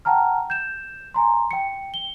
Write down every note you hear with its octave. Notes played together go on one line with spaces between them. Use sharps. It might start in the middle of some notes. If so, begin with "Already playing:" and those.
F#5 G5 A5 A#5 F6
G6 E7
G#5 A#5 C6
G5 C#7
G7